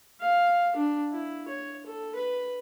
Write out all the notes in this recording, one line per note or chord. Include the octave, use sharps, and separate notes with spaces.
F5
D4
E4
C#5
A4
B4